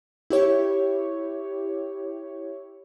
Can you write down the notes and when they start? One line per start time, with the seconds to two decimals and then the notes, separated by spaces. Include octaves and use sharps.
0.30 E4 G4 C#5